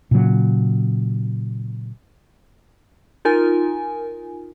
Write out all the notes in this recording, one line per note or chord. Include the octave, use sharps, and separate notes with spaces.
A#2 C#3 F#3
D#4 F4 A#4 G#5